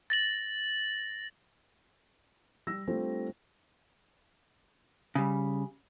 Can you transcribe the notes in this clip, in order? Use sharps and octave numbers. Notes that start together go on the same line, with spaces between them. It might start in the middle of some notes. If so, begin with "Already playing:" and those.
A6 A#6 F#7
G3 E6 A#6
G3 A3 C4 D4 F4
C#3 G3